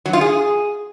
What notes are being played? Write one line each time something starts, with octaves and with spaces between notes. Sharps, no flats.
F#3
F4
G#4